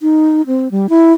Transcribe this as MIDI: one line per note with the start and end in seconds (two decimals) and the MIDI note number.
0.01 0.42 63
0.47 0.71 60
0.71 0.87 55
0.89 1.13 64